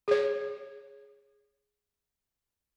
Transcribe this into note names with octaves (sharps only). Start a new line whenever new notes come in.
G#4 C#5